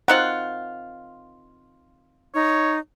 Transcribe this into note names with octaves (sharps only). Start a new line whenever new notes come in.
D#3 C4 F4 F#5
D#4 C#5